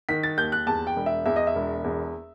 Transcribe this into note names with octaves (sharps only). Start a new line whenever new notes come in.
D#3 B6
A6
D#2 G6
F#6
E2 A5
G5
E1
E5
E2 E5
D#5
E5
E1
E2